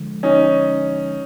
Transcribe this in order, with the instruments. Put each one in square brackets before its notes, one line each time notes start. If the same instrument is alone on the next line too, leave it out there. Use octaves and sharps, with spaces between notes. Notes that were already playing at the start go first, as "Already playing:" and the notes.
Already playing: [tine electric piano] D3 F3 G#3
[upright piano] C#4 D#4